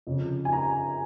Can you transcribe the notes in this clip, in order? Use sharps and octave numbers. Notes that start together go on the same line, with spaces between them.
F2 C#3
G#5
A#5